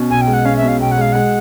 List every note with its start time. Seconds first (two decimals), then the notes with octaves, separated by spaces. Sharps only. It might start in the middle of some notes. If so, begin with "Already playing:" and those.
Already playing: B2 C#4
0.10 B1 G#5
0.21 G5
0.27 G#3
0.33 F#5
0.45 C#4 F5
0.57 E5
0.63 B2
0.68 F5
0.80 B1 G5
0.91 F#5
0.98 G#3 F5
1.13 G#3 F#5